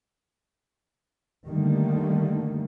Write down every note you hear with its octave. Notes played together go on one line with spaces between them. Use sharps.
D3 D#3 G3 A3 A#3